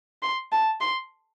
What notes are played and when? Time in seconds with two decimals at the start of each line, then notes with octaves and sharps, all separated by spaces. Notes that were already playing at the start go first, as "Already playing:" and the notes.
0.22 C6
0.52 A5
0.81 C6